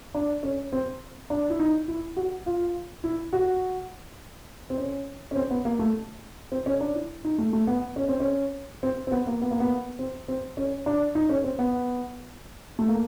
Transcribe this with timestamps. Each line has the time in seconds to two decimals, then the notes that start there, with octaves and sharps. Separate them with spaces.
0.15 D4
0.43 C#4
0.73 C4
1.30 D4
1.50 E4
1.59 D#4
1.88 E4
2.17 F#4
2.46 F4
3.04 E4
3.33 F#4
4.70 C4
4.78 C#4
5.31 C#4
5.36 C4
5.51 B3
5.65 A#3
5.79 A3
6.52 C4
6.66 C#4
6.81 D4
6.95 E4
7.25 D#4
7.38 A3
7.53 A3
7.67 B3
7.96 C#4
8.08 C4
8.20 C#4
8.83 C4
9.07 C4
9.12 B3
9.27 A#3
9.42 B3
9.51 A#3
9.60 B3
9.99 C4
10.28 C4
10.57 C#4
10.86 D4
11.15 D#4
11.29 C#4
11.44 C4
11.59 B3
12.79 A3
12.89 A#3